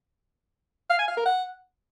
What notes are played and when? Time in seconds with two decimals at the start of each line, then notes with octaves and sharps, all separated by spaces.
0.90 F5
0.99 G#5
1.08 F5
1.17 A#4
1.26 F#5